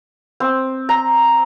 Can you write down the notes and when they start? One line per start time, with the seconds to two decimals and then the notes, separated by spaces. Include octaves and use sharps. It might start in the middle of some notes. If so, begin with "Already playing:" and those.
0.40 C4
0.89 A#5